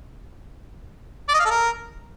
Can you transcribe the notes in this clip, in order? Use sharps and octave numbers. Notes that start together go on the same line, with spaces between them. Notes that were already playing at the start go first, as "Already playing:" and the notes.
D5
D#5
F5
A4
A#4